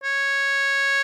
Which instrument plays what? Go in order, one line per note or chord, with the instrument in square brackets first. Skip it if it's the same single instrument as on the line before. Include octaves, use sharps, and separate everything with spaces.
[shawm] C#5